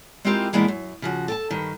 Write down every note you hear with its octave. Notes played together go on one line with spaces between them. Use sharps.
G#3 C4 E4 F4 G4 A#4
A#2 E3 G#3 A#3 B3 D4
F#2
C#3 F3 F#4
A4 G5 A5
G2 D#3 B4